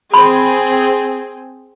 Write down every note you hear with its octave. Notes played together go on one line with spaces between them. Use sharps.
C4 G#4 B5 C6